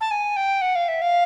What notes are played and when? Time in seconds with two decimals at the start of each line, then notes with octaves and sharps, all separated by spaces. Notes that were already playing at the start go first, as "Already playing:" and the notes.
0.01 A5
0.11 G#5
0.36 G5
0.61 F#5
0.75 F5
0.88 E5
1.02 F5